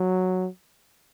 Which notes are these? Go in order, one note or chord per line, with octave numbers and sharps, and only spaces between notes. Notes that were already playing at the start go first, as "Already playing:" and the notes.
Already playing: F#3